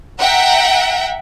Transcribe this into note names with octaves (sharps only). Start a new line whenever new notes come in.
E5 F#5 G5 A#5